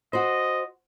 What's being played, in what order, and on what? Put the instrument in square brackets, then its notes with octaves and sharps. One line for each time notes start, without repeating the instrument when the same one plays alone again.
[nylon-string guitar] F#4 C5 [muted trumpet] D#5